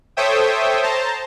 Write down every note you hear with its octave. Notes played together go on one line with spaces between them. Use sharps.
A4 C5 C#5 E5 G5 D#6
C5 A5 A#5